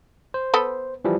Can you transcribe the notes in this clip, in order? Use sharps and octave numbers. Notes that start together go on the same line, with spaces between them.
C5
B3 A4 B4
E3 F3 G3